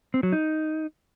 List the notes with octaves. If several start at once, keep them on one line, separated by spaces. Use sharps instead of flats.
C4
F#3
D#4